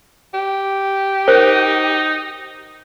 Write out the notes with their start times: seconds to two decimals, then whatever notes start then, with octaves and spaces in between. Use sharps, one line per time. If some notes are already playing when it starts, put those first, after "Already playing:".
0.34 G4
1.28 D#4 A#4 C5